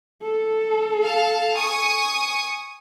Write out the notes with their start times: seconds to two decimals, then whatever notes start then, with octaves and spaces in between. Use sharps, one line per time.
0.22 A4
1.02 F5 A5
1.56 G#5 C#6 D#6